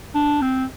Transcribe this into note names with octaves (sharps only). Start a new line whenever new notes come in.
D4
C4